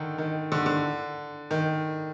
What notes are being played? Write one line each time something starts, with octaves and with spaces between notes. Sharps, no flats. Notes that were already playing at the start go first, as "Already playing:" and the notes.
Already playing: D3 D#3
D#3
D3
D3
D#3